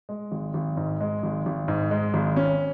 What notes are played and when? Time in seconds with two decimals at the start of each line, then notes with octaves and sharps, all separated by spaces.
0.09 G#3
0.32 G#1
0.54 G#1
0.77 G#2
1.01 G#3
1.23 G#1
1.46 G#1
1.68 G#2
1.91 G#3
2.14 G#1
2.36 C#4